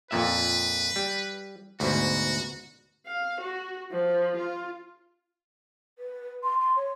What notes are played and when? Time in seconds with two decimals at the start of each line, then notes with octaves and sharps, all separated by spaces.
0.11 F2 A#2 B4 E5
0.96 G3
1.80 D2 G#2 B2 F#4
3.06 F5
3.40 F#4
3.91 F3
4.37 F4
5.99 B4
6.43 C6
6.60 C6
6.77 C#5